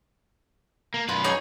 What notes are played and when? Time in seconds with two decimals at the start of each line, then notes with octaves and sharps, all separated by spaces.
0.94 A#3
1.09 F#2 F4 B4
1.24 D#4 G#4 C#5 G#5